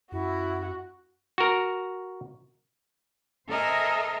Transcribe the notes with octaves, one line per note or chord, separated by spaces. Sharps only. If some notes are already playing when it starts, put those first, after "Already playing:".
F#2 E4 F#4
F#4 A#4
A4 A#4 C5 D#5 E5 G#5